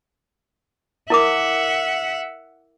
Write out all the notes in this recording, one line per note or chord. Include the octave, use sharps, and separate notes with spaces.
E4 A#4 E5 F#5 D6